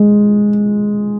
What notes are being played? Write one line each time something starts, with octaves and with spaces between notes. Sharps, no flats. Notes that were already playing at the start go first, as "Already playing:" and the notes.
Already playing: G#3